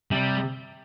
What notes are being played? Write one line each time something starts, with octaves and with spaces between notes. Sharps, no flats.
C3 G3